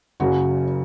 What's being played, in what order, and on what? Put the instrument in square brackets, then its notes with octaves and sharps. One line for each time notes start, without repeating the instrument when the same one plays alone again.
[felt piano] F#1 F#2 C#3 F#4